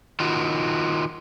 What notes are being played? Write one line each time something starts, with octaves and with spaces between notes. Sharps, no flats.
D#3 F4 F#4